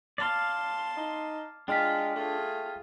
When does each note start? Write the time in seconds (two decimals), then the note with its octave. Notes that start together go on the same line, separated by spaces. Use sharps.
0.18 D5 F5 A5 C6
0.97 D#4
1.68 G#3 D4 F4 G5 F6 B6
2.15 A3 F4 G#4